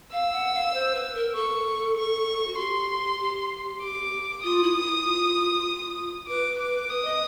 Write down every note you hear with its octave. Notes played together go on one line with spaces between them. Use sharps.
F5 E6
F#5
F5
C5
B4
A#4
A4 C#6
C#6
F#4
G4 C6
G4
D6
F4 D#6
E4
E4
F4
B4 D6
D6
B4 D#6
D#5